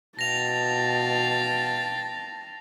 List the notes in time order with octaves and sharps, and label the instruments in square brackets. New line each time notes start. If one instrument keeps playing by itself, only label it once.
[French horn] B2 [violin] F5 G5 [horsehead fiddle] A5 [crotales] A#6 F7